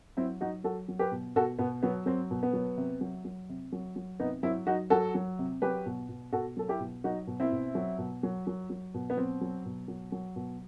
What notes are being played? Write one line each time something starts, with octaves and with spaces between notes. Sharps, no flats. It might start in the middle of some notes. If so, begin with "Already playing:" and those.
F#3 C4 E4
F#3 D#4 F#4
F#3 F#4 A4
F#3
G4 B4
B2
B2 F#4 A4
B2 B3
F#3 B3
F#3 C4
B2
B3
F#3
C3
F#3
F#3
C3
F#3
F#3
C3 B3 D#4
F#3 C4 E4
F#3 D#4 F#4
F#3 F#4 A4
F#3
C3
F#3 G4 B4
B2
B2
B2 F#4 A4
F#3 A4
E4 G4
B2
F#3 D#4 F#4
B2
C4 E4
B2
F#3
B2
F#3
F#3
F#3
B2
B3
F#3 C4
F#3
B2
F#3
F#3
B2